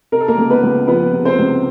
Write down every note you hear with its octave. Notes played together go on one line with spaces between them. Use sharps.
C3 A#4
A4
A#3 A#4
C#2
B3 B4
C#2
F3 B3 B4
C3
C4 C5
C#2